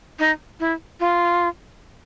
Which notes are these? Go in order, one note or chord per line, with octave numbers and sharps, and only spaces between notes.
D#4
E4
F4